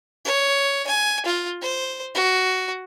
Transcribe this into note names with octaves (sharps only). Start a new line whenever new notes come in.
C#5
G#5
F4
C5
F#4